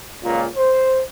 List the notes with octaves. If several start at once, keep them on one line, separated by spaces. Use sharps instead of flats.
C#2 A#2
C5